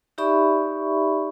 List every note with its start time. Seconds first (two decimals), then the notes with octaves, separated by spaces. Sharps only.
0.18 D#4 G4 D5 E5 B5 C#6